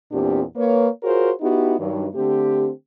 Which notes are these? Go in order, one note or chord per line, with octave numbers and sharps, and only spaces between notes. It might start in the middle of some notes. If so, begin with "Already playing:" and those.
E2 A#2 C4 D4 G4
A#3 B4 C#5
F4 F#4 G#4 A#4 C5 C#5
B3 D#4 E4 F#4 G4
G2 D#3 F#3
D3 A3 C4 G4